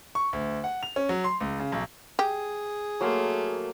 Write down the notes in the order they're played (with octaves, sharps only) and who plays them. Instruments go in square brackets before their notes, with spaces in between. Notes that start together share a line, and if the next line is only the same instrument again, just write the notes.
[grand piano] C#6
D2
F#5
F7
C#4
F#3
C6
C#2
C#3
B1
[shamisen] G4 [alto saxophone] G#4
[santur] F#3 A#3 C6 [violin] A3